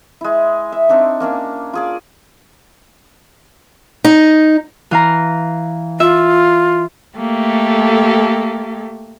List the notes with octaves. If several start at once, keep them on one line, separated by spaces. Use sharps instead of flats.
G#3 E4
E5
C4 D4 D#4 C#5
A#3 C#4 D4 E6
F4 G#4 D5
D#4
E3 F5 A#5
F4 E5
A3 A#3 G4 A4